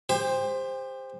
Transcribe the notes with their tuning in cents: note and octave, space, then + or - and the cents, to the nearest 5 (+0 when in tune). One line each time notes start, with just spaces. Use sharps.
G4 +35 C5 +0